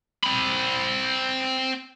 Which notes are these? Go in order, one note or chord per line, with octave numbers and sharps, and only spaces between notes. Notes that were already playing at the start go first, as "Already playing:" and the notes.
C4 B5